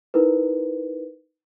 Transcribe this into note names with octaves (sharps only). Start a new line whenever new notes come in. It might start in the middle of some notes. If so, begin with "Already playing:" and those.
D#4 E4 A#4 B4